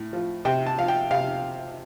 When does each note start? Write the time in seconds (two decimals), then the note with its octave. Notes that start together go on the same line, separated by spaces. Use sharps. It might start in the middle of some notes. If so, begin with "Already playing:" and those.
Already playing: A2
0.13 F3
0.45 C3 G5
0.67 A5
0.78 F3 F5
0.88 G5
1.11 C3 F5